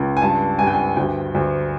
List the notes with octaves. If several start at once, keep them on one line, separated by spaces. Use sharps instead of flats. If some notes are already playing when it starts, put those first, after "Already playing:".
Already playing: C#2
G#5
G2 A5
G2 G#5
G5
G#5
D2 G5
D2